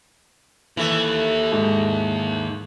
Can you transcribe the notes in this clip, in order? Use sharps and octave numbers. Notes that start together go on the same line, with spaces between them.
D#3 E3 A3 A#3
G#2